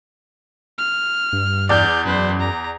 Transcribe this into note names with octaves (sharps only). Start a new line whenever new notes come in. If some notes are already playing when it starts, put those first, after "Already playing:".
F6
G2
E2 D5 F6 G6
F#2 B4 C5
A#5